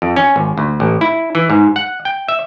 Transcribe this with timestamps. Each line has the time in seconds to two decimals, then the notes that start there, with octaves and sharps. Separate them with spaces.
0.02 F2
0.16 C#4
0.36 G#1
0.58 D2
0.80 A1
1.01 E4
1.35 E3
1.50 G#2
1.76 F#5
2.05 G5
2.29 E5